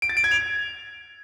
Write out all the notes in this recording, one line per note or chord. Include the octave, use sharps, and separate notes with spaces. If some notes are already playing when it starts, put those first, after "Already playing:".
D7
A6
D7
G#6
F7